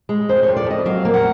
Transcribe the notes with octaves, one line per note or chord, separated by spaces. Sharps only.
G#3
F2 C5
C#5
F2
D5
F2 D#5
F#3 F5
A#3
F#5